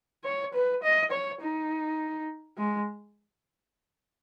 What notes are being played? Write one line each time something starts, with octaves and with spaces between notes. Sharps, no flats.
C#5
B4
D#5
C#5
D#4
G#3